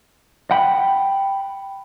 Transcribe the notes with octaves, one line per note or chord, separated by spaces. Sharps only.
F#5 G5 B5